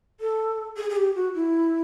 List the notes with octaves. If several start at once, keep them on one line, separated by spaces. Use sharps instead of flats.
A4
G#4
G#4
G4
F#4
E4